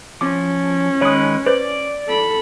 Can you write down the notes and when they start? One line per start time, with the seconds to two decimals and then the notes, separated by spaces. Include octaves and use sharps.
0.21 F3 C#4 D6
1.01 D#3 G#3 B4 C#5 D#6
1.46 B4 C5 D5
2.08 A4 B5